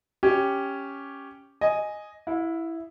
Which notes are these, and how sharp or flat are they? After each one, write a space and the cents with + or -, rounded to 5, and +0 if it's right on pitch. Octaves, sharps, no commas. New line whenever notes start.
C#4 +0 G4 +0 C#5 +0
D#5 +0 G#5 +0
E4 +0 F5 +45